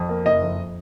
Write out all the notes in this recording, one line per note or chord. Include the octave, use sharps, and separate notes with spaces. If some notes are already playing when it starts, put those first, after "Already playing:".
Already playing: F2
A#3
F#1 D#5
F2